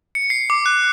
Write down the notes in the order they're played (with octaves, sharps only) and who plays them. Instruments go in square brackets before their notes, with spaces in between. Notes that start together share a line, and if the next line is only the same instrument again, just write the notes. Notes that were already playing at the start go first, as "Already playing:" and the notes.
[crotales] C#7
C7
D6
F#6